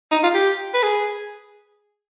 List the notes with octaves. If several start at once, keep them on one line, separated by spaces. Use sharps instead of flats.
D#4
F4
G4
B4
G#4